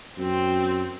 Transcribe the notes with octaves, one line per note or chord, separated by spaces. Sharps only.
F#2 C4